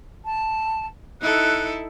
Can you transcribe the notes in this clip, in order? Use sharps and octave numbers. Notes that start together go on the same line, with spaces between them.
A5
D#4 E4 A4 F#6